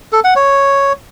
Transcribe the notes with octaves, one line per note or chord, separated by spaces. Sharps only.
A4
F#5
C#5